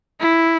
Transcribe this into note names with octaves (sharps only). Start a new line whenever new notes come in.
E4